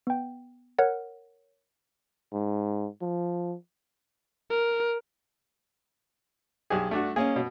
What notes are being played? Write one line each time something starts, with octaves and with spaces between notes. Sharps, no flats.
B3 G5
A#4 C#5 F#5
G#2
F3
A#4
B1 G4 G#4
A3 D4 F#4
A#3 C#4 G#4 D#5
B2